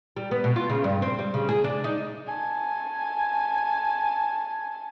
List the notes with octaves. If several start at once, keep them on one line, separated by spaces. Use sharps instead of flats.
G3
B3
B2
F4
C#3
G2
C4
G3
C#3
G#4
D4
D#4
G#5 A5